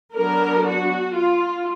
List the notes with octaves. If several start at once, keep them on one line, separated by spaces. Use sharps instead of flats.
F#3 B3 D4 A#4
F#4
F4